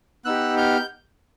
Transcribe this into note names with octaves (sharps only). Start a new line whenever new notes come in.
B3 D#4 G4 E6 F#6
F6 G6